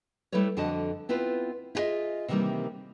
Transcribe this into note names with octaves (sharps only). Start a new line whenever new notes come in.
G3 A3 E4 A4 B4 C#5
F2 D3 D4 F#4 D#5 A5
B3 C4 E4 F4 B4
E4 F4 G#4 A4 D#5 E5
C3 D#3 E3 G3 A#3 C4